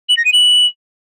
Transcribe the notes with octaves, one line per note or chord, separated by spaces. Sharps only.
F#7
A#6
D#7
F#7